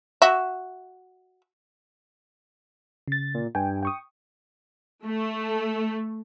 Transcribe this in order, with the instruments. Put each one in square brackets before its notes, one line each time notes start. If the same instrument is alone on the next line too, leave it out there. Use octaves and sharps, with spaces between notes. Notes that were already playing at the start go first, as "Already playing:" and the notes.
[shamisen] F#4 E5
[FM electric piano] C#3 A6
[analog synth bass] A#2
[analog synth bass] G2 [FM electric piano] G5 G#5
[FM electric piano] G5 C#6 D#6
[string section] A3